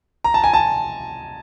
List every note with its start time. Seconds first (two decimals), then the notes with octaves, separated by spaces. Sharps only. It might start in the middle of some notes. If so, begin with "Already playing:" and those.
0.24 A#5
0.34 A5
0.44 G#5
0.53 A5